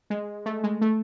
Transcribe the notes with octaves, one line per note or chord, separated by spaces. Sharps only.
G#3
A3
G#3
A3